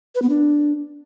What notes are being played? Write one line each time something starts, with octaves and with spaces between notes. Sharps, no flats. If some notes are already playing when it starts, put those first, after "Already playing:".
B4
B3
D4